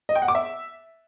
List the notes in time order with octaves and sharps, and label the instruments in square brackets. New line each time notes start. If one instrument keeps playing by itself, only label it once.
[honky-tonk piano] D#5
G5
F#5
D6
E5